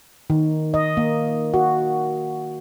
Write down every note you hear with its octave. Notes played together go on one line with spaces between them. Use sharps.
D#3
D#5
A#3
F#4